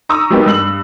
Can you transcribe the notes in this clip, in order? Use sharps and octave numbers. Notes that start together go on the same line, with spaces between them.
A#5 C#6 D#6 E6
F#3 G#3 A#3 B3 D#4 G4
G2 E6 F#7